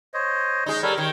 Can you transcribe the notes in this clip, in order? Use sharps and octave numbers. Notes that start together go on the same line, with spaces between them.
C5 C#5 D#5
G#3 D#4 D#5
G3 A4 A#4 C#5
D#3 C#5 C#6